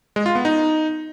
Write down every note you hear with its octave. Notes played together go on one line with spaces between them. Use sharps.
G#3
F4
B3
D#4